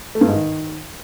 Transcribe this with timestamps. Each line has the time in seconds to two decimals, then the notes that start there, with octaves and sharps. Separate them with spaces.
0.15 A3
0.21 G2
0.27 G#2
0.34 D#3